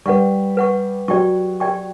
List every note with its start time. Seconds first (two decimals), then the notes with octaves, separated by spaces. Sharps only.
0.06 G3 B4 F#5 C#6
0.57 B4 F#5 C#6
1.08 F#3 G4 D5 G5 C#6
1.60 G4 D5 G5 C#6